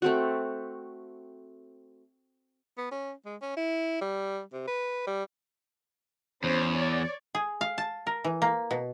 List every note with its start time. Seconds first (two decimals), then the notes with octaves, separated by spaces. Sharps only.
0.02 A3 C4 F#4
2.78 B3
2.91 C#4
3.25 G#3
3.42 C#4
3.57 E4
4.01 G3
4.53 C3
4.67 B4
5.07 G3
6.44 E2 C#4 C5
6.73 C#5 D5
7.35 G#4
7.61 F5
7.78 A5
8.07 A#4
8.24 E3
8.42 A#3
8.71 B2